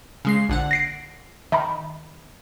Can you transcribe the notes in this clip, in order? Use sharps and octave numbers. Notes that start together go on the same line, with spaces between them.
C#3 G#3 C7
A#1 D3 F#5
A#6 C7 D7
D#3 E5 A#5 B5